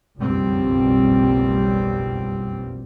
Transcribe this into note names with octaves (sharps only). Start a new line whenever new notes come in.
F#1 B1 F2 B2 G3 C4